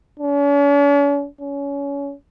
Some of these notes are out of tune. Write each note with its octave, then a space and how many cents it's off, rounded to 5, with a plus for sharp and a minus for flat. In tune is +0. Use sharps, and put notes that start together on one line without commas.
C#4 +45
C#4 +25